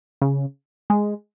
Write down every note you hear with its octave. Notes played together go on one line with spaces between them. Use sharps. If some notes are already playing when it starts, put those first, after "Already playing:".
C#3
G#3